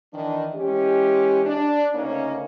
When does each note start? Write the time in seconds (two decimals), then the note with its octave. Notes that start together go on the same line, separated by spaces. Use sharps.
0.13 D#3 E3 D4
0.55 E3 G#3 C#4 G4
1.46 D4
1.94 D2 C#3 A#3 C#4 D#4 C#5